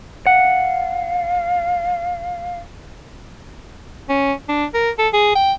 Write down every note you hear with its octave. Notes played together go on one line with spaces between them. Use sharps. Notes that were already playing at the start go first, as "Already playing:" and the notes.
F5 F#5
C#4
D4
A#4
A4
G#4
G5